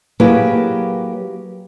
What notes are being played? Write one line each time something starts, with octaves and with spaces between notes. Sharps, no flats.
F#3 A#3 E4 G4 G#4 B4